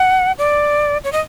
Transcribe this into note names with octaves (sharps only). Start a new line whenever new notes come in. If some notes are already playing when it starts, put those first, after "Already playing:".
Already playing: F#5
D5
C#5
D#5